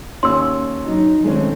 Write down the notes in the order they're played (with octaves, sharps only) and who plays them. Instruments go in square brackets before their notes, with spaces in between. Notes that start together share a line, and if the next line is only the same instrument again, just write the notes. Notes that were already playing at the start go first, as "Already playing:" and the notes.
[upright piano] D#2 C#4 [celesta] C6 E6
[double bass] F#3 D#4
[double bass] D#3 C4 [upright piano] G#3 A3 C#4